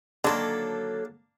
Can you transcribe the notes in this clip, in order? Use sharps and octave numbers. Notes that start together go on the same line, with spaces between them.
D3 D#3 F#3 A#3 D4 A4